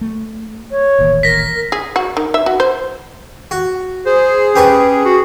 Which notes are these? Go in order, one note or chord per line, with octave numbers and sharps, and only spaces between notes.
A3
C#5
D#1 A1 D#2
A#4 A#6 B6
G#4
F#4
D#3
E5
F#4
C5
F#4
G#4 C5
C#4 G4 B4 C#6
F#4